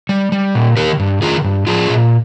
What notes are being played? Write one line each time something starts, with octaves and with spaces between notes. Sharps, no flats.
G3
G3
A#2
D#3 G4 A#4
G2
D#3 F4 G#4
G2
F3 F4 G#4
A#2